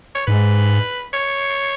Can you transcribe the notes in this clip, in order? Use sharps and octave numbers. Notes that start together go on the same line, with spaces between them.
C#5
G#2 B4
C#5